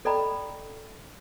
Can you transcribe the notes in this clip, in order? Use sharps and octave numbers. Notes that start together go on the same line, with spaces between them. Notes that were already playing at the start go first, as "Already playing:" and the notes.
A4 D5 D#5 G5 A#5 B5